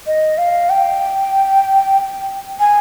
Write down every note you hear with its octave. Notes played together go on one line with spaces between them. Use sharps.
D#5
F5
G5
G#5